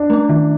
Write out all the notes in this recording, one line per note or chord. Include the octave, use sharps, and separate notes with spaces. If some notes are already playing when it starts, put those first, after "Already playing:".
Already playing: D4
A3 C#4
D#3